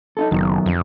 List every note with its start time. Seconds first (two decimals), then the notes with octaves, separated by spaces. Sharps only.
0.17 D#4 E4 A4
0.31 F#1 F#2 D#3 F#3
0.66 F2